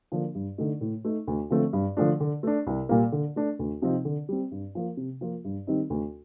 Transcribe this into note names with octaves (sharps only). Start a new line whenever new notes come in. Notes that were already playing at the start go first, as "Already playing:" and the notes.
D3 F3 A#3 D4
G2
D3 A3 D#4
A2
A3 D#4
D2
D3 F3 A3 C4
G2
D3 F3 A3 D4
D3
A3 D4
C2
A#2 G3 A#3
D3
A3 D4
D2
C3 F3 C4 D#4
D3
G3 C4
G2
F3 A#3
C3
F3 A#3 F4
G2
D#3 G3 C4 D#4
D2